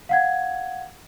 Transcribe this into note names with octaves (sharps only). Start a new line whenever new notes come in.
F5 F#5 G#6